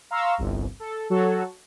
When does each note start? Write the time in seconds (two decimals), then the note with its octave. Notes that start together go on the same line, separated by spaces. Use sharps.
0.11 F5 A#5 C6 C#6 E6
0.38 G1 C2
0.80 A4
1.10 F#3 F#4 A4 C#5